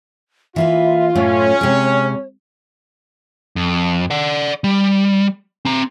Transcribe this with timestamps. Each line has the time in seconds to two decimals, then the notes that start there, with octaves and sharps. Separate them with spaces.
0.56 E3 A#3 F4 B4 E5
1.15 F#2 A2 A3 C#4 C#5
1.61 C3 G#3
3.56 F2
4.10 D5 F#5
4.64 G3
5.65 C4 A#5